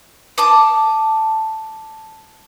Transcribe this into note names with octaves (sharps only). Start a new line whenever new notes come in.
A5 D6 D#6